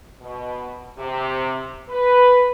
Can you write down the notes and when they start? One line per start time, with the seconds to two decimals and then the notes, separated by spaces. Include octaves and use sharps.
0.21 B2
0.98 C3
1.89 B4